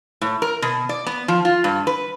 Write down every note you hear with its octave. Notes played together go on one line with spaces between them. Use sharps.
A2
A#4
B2
D5
B3
F3
F4
G2
B4